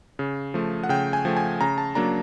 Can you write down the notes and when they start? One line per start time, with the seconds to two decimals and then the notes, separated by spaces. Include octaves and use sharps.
0.19 C#3
0.54 F3 A3
0.83 F#5
0.89 C#3 G5
1.13 G#5
1.25 F3 A3
1.37 G#5
1.61 C#3 A#5
1.78 A5
1.95 F#3 A#3 D4 A#5